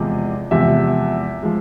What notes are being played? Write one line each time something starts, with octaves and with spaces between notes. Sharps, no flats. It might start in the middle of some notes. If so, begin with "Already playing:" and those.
Already playing: E2 C3 F3 G#3 D#5
E2 C3 F3 G#3 E5
F3 G#3